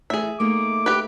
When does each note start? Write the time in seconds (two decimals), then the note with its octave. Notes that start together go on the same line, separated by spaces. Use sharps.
0.10 E3 A3 G#4 E5
0.40 A3 A#3 D#4 D6
0.86 G4 B4